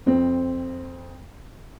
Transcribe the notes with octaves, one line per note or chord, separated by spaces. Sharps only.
F2 C4